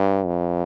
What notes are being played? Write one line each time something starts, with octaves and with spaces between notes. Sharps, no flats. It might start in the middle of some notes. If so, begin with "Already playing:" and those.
Already playing: G2
F2